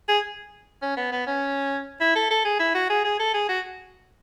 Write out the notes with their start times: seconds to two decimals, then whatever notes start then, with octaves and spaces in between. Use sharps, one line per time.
0.08 G#4
0.82 C#4
0.97 B3
1.12 B3
1.27 C#4
2.01 E4
2.16 A4
2.31 A4
2.45 G#4
2.60 E4
2.75 F#4
2.90 G#4
3.05 G#4
3.19 A4
3.34 G#4
3.49 F#4